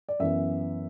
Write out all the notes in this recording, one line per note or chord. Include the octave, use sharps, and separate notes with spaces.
D5
F#2 E3 B3 E5